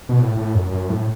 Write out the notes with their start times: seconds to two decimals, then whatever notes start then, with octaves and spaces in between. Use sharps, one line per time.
0.09 B2
0.19 A2
0.37 A2
0.54 F#2
0.71 F#2
0.90 A2